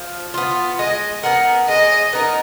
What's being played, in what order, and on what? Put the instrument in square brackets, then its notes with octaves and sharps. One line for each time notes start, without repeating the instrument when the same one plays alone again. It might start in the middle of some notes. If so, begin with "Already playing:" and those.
Already playing: [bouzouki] F3
B3 F4
[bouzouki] G#3 [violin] D#5
[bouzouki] B3 D#4 A#4 [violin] F#5
[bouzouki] G#3 [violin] D#5
[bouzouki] B3 D#4 A#4